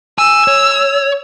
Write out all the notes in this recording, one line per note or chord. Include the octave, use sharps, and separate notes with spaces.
G#5 E6
C#5